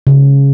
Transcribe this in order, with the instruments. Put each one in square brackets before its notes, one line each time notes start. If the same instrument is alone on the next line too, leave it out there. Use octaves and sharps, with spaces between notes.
[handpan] C#3